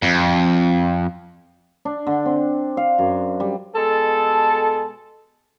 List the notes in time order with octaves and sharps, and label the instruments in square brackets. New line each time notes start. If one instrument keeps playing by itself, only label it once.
[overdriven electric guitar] F2
[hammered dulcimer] D4
D3
C4
F5
F#2
G3
[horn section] B2 G#3 A4